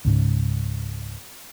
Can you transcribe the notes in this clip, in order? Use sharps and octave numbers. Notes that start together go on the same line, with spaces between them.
C#2 G#2 C#3